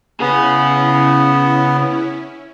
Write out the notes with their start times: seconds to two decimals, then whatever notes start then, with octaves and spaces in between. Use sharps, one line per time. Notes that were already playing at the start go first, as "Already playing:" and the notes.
0.20 C#3 B3 C#4 E4 G#4